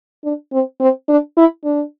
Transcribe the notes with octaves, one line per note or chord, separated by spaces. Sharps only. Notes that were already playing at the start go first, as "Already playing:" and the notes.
D4
C4
C4
D4
E4
D4